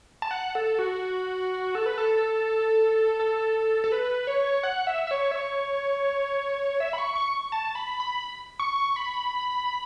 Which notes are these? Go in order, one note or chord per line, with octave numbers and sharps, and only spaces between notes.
A5
F#5
A4
F#4
A4
B4
A4
A4
A4
B4
C#5
F#5
E5
E5
C#5
E5
C#5
E5
B5
C#6
C#6
A5
B5
B5
C#6
B5